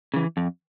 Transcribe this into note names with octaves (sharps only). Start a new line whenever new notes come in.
C#3 E3
F2